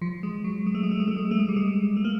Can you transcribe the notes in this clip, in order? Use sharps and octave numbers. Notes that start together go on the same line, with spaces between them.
F3
G#3
F#3
G#3
A3
G#3
A3
G#3
A3
G#3
A3
G#3
G3
G#3
A3
A#3